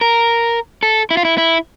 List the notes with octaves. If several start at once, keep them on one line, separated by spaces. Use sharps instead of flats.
A#4
A4
E4
F4
E4
E4